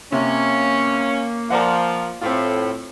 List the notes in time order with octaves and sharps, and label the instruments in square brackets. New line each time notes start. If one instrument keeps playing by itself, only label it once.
[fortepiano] C3 [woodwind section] A#3 [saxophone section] C#4
[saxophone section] F3 [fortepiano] A#4 D5 F#5
[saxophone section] A2 [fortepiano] C4 F4